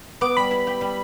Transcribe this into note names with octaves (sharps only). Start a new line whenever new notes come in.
B3 D6
G3 B5
E4
G4
G3